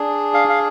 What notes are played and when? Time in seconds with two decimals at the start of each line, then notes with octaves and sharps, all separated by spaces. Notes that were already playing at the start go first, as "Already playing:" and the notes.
Already playing: D4 G#4
0.34 F5
0.49 F5